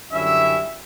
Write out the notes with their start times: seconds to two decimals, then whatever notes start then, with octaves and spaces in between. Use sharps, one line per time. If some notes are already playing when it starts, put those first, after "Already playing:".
0.12 F#2 D3 G3 C#4 E4 E5